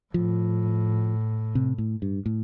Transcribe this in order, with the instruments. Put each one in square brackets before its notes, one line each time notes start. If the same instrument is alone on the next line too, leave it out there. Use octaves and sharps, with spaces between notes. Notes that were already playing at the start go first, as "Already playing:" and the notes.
[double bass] A2 [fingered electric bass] F3
[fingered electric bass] C3
A2
G2
A2